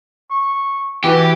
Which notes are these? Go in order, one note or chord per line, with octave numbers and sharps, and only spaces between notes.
C#6
E3 F#4 G4